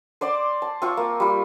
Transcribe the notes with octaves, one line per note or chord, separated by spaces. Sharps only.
C5 D5 C6 D6
A5
C4 F4 C#6
A#3
G3 F4